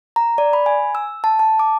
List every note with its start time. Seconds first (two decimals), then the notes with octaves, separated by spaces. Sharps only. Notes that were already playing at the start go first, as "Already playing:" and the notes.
0.16 A#5
0.38 D5
0.53 B5
0.66 G#5
0.95 E6
1.24 A5
1.39 A5
1.59 D6